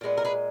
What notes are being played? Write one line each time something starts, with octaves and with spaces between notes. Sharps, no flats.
A#2 G#3 B3
A#4
G#4 B4